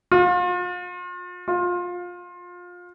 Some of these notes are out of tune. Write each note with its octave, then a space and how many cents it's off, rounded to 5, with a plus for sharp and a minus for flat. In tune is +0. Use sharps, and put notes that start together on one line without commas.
F4 +40
F4 +25